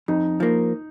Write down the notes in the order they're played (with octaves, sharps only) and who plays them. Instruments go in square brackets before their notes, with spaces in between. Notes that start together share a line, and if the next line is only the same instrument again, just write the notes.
[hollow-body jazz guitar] F2 [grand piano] D#4
[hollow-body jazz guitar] F3 A#3